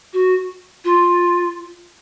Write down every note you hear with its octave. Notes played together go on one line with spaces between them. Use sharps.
F#4
F4